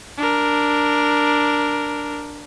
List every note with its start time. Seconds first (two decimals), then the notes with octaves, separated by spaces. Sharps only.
0.18 D4 A#4